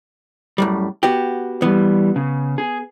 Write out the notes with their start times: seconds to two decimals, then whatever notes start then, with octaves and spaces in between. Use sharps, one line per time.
0.58 F#2 A2 G3
1.03 B3 F#4 G4
1.62 E3 G3 B3
2.16 C#3
2.58 G#4